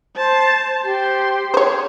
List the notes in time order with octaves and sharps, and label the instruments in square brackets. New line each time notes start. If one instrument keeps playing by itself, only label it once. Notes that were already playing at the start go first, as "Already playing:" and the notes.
[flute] C5 [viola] A5
[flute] G4 [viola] C5 C6
[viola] G#4 [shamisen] C5 C#5